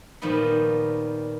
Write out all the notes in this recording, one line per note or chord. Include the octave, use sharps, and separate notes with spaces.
A#2 D#3 F3 G3 B3 D#4